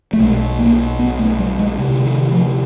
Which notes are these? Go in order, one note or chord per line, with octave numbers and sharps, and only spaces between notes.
A3
B1 B2 G#3
A#3
B3
A3
G3
G#3
D2 C3
D#3
F3